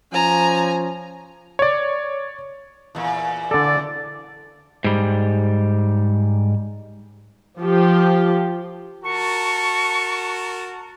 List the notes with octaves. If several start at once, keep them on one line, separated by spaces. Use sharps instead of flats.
F3 C#4 G#5 A#5
C#5 D5
E2 A#2
D3 A4 D5
G#2 G3
F3 G4
F#4 A#4 A5 C#6